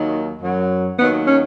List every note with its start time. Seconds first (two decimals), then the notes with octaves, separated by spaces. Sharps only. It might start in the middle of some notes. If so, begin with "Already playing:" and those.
Already playing: D#2 D#3 F#3
0.42 F#2 F#3
0.98 D#2 D#3 F#3 B3
1.27 C#4